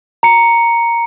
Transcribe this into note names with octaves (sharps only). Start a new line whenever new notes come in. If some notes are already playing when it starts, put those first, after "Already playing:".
A#5 C#7